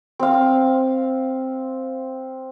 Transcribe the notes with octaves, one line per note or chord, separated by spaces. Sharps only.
C4 F5